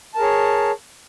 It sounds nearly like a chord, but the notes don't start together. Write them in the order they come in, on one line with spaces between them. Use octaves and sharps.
A5 A#4 G#4 C#5